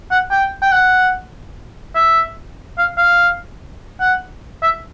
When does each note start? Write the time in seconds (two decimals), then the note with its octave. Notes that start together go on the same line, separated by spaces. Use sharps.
0.11 F#5
0.31 G5
0.62 G5
0.72 F#5
1.95 E5
2.78 F5
2.98 F5
4.00 F#5
4.63 E5